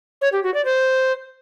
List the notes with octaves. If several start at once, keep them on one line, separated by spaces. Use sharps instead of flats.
C#5
G4
F#4
D5
C5